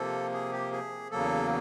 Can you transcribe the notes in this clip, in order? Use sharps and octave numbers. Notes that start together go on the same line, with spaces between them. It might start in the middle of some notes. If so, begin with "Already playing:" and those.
Already playing: C3 F3 A#3 A4
G#4
G4
G#4
E2 C#3 F#3 A#3 A4